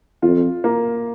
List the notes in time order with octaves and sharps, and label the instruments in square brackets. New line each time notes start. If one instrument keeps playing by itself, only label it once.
[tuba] F2 [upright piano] F4
[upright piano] A#3